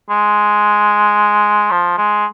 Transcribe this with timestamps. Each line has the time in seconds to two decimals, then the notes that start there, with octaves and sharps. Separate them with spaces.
0.10 G#3
1.71 F3
1.98 G#3